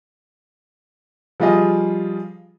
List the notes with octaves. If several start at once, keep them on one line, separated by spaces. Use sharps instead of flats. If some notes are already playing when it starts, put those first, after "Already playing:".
F3 G3 F4 G#4 D#5